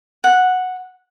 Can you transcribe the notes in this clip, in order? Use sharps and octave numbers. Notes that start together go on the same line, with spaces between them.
F#5